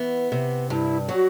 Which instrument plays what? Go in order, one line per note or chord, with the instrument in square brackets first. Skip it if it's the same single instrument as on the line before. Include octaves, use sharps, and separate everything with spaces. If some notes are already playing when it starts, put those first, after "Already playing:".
Already playing: [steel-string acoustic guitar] E3 B3
C3
[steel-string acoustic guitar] G2 [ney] E4
[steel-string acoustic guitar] F#3 [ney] F#4